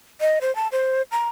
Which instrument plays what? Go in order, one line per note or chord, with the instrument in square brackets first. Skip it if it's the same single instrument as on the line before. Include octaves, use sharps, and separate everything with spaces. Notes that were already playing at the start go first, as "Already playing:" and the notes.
[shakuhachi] D#5
C5
A5
C5
A#5